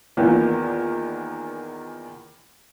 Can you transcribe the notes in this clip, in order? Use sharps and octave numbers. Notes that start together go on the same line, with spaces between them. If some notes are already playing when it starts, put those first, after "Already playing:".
E2 A#2 D#3 E3 A#3 B3